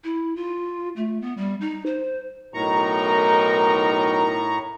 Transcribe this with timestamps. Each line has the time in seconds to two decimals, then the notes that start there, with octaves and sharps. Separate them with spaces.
0.04 E4
0.36 F4
0.96 A3
1.22 B3
1.37 G3
1.61 D#4
1.86 C5
2.54 B1 A2 D#4 A#4 A#5 C#6